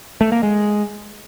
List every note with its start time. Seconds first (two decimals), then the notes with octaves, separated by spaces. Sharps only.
0.21 A3
0.32 A#3
0.43 G#3